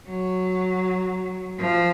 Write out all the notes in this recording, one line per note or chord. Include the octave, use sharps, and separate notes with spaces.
F#3
F3